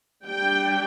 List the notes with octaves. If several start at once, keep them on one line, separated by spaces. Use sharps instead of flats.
G3 D4 G5